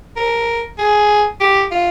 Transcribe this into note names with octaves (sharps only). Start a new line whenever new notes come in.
A#4
G#4
G4
F4